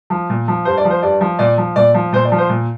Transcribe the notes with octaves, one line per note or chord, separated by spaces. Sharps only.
F3
A#2
F3
G2 C5
D5
F3
C5
G2 D5
F3
A#2 D5
F3
A#2 D5
F3
A#2 C5
D5
F3
C5
A#2